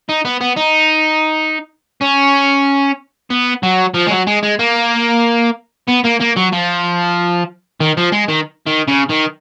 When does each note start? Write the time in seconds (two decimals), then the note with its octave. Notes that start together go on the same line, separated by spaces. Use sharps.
0.09 D#4
0.25 B3
0.41 B3
0.57 D#4
2.02 C#4
3.31 B3
3.63 F#3
3.94 F3
4.07 G#3
4.11 F#3
4.27 G#3
4.43 G#3
4.59 A#3
5.88 B3
6.04 A#3
6.20 A#3
6.36 F#3
6.52 F3
7.80 D#3
7.97 F3
8.12 G#3
8.29 D#3
8.67 D#3
8.88 C#3
9.09 D#3